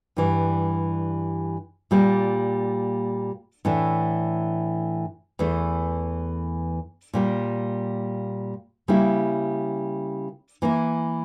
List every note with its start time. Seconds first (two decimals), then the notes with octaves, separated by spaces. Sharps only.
0.17 G2 E3 G3
1.91 A#2 G3 A#3
3.65 A2 E3 A3 D4
5.39 E2 E3 A3
7.13 A#2 G3 A#3
8.88 C#3 G3 A#3 E4
10.62 E3 A#3 E4